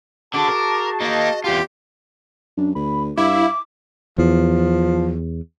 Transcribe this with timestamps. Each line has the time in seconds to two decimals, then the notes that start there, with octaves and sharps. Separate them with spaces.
0.34 D3 D4 F#4 G#4 A5 D6
0.48 A#4
1.00 A#3 D#4 D#5
1.44 E2 F4 G4
2.57 F#2 D4
2.75 D2 B5
3.17 G2 E4 F5 D6
4.18 E2 F3